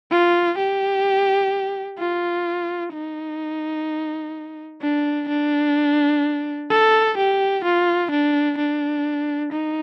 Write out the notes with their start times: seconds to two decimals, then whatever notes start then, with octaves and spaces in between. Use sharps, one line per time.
0.11 F4
0.58 G4
1.99 F4
2.93 D#4
4.82 D4
5.28 D4
6.70 A4
7.17 G4
7.64 F4
8.11 D4
8.57 D4
9.52 D#4